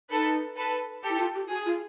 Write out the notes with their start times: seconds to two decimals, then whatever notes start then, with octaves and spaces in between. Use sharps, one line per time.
0.10 D#4 A4 B4
0.57 A4 B4
1.03 G4 A4
1.10 E4
1.20 F4
1.35 G4
1.50 F#4 G#4
1.66 F4